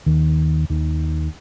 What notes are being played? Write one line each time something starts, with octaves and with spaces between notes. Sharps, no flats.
D#2 D#3
D#2 D#3